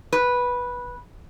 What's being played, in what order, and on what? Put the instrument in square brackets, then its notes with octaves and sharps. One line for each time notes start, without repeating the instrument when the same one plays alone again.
[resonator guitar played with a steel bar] B4